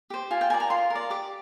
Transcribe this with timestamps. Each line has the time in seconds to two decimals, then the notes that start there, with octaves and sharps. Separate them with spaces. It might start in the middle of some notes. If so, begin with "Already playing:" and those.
0.10 G4 C5
0.31 F4 G#5
0.41 G5
0.50 A#4 D5 G#5
0.60 A#5
0.70 F4 C6
0.90 A#4
0.95 D5
1.10 G4 D6